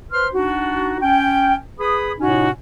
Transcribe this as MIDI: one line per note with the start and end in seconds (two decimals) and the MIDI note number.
0.12 0.28 71
0.12 0.28 72
0.12 0.28 84
0.12 0.28 89
0.33 0.97 62
0.33 0.97 63
0.33 0.97 66
1.01 1.55 61
1.01 1.55 79
1.79 2.12 68
1.79 2.12 71
1.79 2.12 83
1.79 2.12 87
2.20 2.50 45
2.20 2.50 48
2.20 2.50 61
2.20 2.50 63
2.20 2.50 66